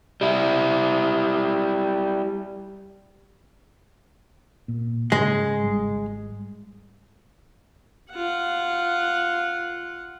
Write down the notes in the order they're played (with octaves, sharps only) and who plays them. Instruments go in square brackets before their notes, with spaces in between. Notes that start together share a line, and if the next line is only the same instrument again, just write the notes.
[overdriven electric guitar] G3 E4
[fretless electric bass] A#2
[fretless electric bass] G#2 C#3 [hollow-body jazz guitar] G#3
[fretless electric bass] G#1 G3
[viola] F4 F#5